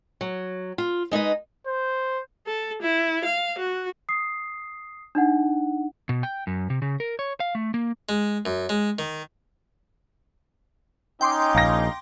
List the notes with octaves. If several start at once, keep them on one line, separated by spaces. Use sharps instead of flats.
F#3
F4
G#3 D#4 B4 D#5
C5
A4
E4
F5
F#4
D#6 C7
D4 D#4 F#5
B2
G5
F#2
C3
C#3
A#4
C#5
F5
A3
A#3
G#3
F#2
G#3
D#3
C#4 D#4 G5 C6 D6
A#1 F5 A#5 A#6